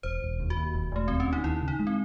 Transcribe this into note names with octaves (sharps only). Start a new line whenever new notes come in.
E1 C5
E1
D#2
F#4
D#2
E1
E1 A3
D#2 C4
C#4
D#2
D#4
D#2 E4
C#3
D#4
G#3
C4